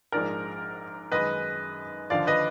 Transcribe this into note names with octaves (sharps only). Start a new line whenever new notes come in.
A#1 G#2 F3 G#3 A#4 D5
F#2 D#3 G#3 B4 D#5
D#2 D3 F3 D5 F5
B4 D#5